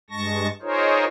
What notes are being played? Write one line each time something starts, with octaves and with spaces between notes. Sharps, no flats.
G2 G#3 A5 C#6 A#6
D#4 F4 G#4 A#4 C5 C#5